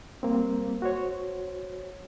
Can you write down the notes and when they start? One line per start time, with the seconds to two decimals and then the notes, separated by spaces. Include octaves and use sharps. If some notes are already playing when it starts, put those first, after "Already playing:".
0.23 G3 A#3 C4
0.82 F#4 C5 C#5